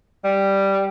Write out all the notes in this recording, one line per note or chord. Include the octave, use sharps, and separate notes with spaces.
G3